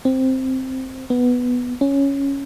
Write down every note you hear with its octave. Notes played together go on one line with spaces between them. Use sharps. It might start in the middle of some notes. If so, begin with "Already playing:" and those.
C4
B3
C#4